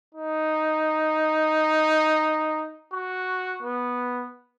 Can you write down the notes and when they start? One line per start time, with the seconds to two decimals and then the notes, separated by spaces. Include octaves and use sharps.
0.15 D#4
2.93 F#4
3.63 B3